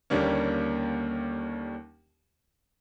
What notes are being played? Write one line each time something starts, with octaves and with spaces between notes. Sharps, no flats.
D#2 D3 G3 A#3 C#4